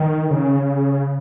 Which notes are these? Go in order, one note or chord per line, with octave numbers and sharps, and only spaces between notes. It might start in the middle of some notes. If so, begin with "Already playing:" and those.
Already playing: D#3
C#3